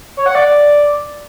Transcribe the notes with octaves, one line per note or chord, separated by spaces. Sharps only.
C#5
F#5
D5